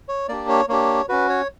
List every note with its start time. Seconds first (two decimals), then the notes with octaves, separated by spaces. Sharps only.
0.09 C#5
0.28 A#3 D4 G4 D5
0.49 C#5
0.69 A#3 D4 G4 C#5
1.09 C#4 F#4 B4
1.29 C#5